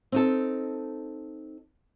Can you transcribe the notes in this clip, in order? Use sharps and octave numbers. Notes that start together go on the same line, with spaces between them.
C4 D#4 A4